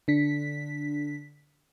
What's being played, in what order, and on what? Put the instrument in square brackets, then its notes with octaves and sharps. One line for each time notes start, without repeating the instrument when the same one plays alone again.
[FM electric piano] D3 D4 B6